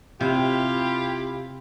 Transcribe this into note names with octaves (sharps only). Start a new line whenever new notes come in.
C3 E4 F4 G4